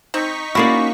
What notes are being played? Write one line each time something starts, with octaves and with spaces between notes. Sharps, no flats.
C4 D#4 C#6 B6
A#3 C#4 E4 F#4 G#4 D5